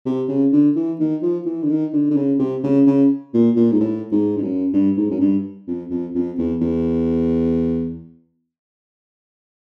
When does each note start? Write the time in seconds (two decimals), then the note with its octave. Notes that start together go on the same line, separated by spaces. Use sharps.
0.06 C3
0.28 C#3
0.53 D3
0.76 E3
1.00 D#3
1.22 F3
1.45 E3
1.63 D3
1.69 D#3
1.93 D3
2.11 D3
2.17 C#3
2.39 C3
2.64 C#3
2.87 C#3
3.34 A#2
3.56 A#2
3.72 G#2
3.80 A2
4.12 G#2
4.37 G2
4.43 F#2
4.73 G2
4.97 G#2
5.11 F#2
5.20 G2
5.68 F2
5.90 F2
6.15 F2
6.38 E2
6.61 E2